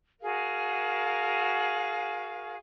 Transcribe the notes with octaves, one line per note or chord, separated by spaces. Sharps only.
F#4 G#4 A#4 F5